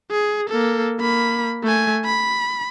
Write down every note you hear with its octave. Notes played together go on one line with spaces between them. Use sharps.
G#4
A#3 A4
A#3 B5
A3 G#5
B5